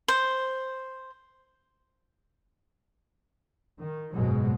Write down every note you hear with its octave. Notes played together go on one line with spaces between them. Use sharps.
C5
D#3
F#1 G#2 B2 F#3 G#3